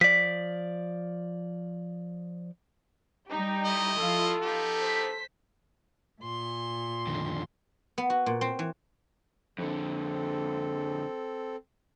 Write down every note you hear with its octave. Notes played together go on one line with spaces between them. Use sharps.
F3 D5 B6
G3 D#4 G4
A3 E4 D#5
F3 F4 A4
B3 D#4 G4
C5 B6
A#2 C6
F2 D3 D#3
B3
F#4
A#2
C4
E3
F2 D3 C4 A4